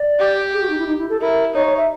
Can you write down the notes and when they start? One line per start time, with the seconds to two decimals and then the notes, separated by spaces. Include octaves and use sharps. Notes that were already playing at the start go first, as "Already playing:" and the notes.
Already playing: D5
0.19 G4
0.54 G#4
0.62 F#4
0.69 D#4
0.78 E4
0.87 D#4
0.98 E4
1.09 A4
1.21 E4 A#4
1.54 D#4 C#5
1.66 C#5
1.77 E5